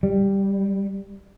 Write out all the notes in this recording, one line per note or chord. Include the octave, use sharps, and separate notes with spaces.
G3